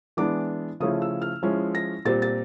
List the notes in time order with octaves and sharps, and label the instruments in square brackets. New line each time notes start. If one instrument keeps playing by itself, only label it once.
[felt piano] E3 G#3 B3 D4 D6
C#3 F3 A3 C#4 E4 D#6
E6
F6
F3 G#3 C#4 E4
A#6
A#2 G3 C4 A6
A6